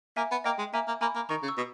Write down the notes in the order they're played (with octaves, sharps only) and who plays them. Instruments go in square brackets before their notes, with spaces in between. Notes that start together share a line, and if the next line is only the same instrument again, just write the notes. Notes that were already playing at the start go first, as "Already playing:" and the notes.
[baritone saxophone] A#3 [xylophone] E5 G#5
[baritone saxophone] B3
[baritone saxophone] A#3 [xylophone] D#5 G5
[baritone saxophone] G#3
[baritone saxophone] A#3 [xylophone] E5 G#5
[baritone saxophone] A#3
[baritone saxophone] A#3 [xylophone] G#5 B5
[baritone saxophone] A#3
[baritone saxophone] D#3 [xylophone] A#5 C#6
[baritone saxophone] C#3
[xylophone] C#6 E6
[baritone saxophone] B2